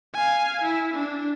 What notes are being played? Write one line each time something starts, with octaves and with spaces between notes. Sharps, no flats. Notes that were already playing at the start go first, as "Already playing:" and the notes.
F5 G#5
E4
D4